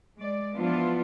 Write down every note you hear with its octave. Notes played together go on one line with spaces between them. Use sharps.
G#3 D5
E3 F3 B3 D4 E4 F4